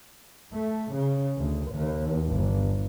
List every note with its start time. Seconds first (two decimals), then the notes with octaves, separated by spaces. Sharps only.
0.53 A3
0.94 C#3
1.40 D2
1.73 D#2
2.29 G1